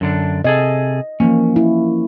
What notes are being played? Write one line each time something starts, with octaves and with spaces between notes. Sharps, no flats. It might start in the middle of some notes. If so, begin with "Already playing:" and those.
F#2 D3 D4
C3 G#4 A4 D#5
E3 F3 A#3 C#4
E4